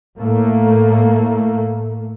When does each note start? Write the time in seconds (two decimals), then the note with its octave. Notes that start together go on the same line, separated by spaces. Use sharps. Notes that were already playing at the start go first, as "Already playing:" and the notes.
0.19 A2 A3 A#3